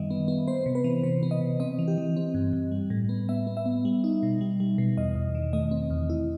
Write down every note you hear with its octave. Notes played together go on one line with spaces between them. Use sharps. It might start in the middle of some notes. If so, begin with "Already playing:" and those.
Already playing: F#2 D#3 G3 B3 D#5 E5
B3
B3
B3 C5
C3
B4
E3
C3 C5
B3
D#5
C3
C4 D#5
E3
G4
E3
C4
G2
G2
G3
A2
B3
B3 E5
B3
E5
B3
G3
D#4
B2
G3
G3
B2
E2 D#5
E2
D#3
A3 D#5
C4
E2
E4